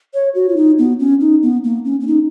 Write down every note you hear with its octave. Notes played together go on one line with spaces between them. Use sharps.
C#5
F#4
F4
D#4
B3
C#4
D#4
B3
A#3
C#4
C#4
D#4